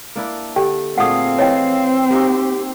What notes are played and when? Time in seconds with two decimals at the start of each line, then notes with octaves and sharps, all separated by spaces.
0.16 A#3 D4 E4
0.56 D3 G4 G5
0.98 A#2 A3 C4 G#4 F5 F#5 D#6
1.38 E3 C#5 D#5 G5
2.10 A#3 D#4 F#4 G4